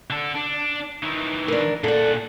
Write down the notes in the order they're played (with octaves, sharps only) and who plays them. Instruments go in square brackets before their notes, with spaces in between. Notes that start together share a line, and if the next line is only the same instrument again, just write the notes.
[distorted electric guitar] D3 A4
D4
D#3 E3
[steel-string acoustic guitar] D4 A#4
[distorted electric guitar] A#2 F#5 [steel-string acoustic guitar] D4 A4